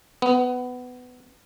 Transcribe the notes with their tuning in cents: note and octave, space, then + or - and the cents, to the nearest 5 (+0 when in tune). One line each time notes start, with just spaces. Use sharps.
B3 +15